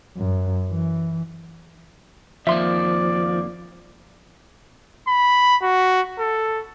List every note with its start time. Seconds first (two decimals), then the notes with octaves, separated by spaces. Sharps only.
0.17 F#2
0.71 E3
2.47 F2 D#3 F3 A#3 D5 E5 C6
5.08 B5
5.62 F#4
6.19 A4